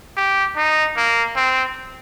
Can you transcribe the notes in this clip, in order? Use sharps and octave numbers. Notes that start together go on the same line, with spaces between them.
G4
D#4
A#3
C4